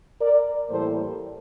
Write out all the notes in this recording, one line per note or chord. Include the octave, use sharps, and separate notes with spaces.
A#4 D5
A2 E3 G3 A#3 A4 C5